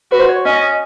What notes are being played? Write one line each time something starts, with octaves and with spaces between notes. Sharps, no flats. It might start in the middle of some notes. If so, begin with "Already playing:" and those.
F#4 B4
C5
C#5
C#4 D#5